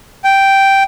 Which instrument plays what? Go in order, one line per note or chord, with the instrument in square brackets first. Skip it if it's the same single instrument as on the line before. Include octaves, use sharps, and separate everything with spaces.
[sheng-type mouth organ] G5